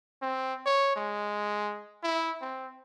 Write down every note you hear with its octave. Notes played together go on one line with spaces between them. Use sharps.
C4
C#5
G#3
E4
C4